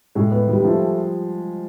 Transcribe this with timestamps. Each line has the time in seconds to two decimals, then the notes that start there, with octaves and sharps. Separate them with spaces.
0.15 A2 G#3
0.32 B3
0.48 D#3 G3
0.64 F3 A3